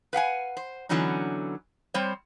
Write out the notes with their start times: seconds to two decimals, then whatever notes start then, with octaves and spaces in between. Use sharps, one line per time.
0.13 B4 F5 F#5 G#5
0.57 C5
0.89 D3 E3 F#3 B3 C#4 D#4
1.94 G3 C4 C5 C#5